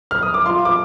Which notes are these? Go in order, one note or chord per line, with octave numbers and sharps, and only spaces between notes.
F6
D#6
D6
F4 C6
D6